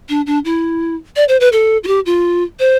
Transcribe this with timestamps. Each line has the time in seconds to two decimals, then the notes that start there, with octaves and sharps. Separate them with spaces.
0.09 D4
0.26 D4
0.45 E4
1.16 D5
1.28 C5
1.40 B4
1.52 A4
1.84 F4
1.87 G4
2.06 F4
2.59 C5